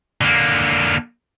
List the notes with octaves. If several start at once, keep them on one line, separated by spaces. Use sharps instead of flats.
D3 A#3